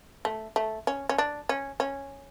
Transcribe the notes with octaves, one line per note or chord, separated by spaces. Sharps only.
A3
A3
C#4
C#4
D4
C#4
C#4